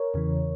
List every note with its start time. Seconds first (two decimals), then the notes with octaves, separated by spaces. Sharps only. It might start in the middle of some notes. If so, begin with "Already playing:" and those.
Already playing: A#4 C#5
0.14 E2 C#3 E3